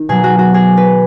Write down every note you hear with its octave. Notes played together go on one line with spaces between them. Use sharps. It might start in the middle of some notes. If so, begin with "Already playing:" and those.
Already playing: D#3
B2 F#3 G#4
F#4
F#4
G#4
B4